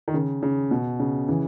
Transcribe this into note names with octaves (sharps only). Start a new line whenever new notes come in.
D#3
C#3
C#3
B2
C#3
C#3 E3